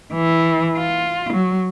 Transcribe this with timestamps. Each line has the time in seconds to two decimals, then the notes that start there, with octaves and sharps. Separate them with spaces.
0.13 E3
0.76 F4
1.33 F#3